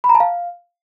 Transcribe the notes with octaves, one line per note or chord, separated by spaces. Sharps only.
B5
A#5
A5
F5